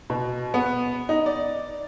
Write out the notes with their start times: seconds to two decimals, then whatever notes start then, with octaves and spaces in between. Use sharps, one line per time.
0.10 B2
0.54 B3
1.09 D#4
1.26 D5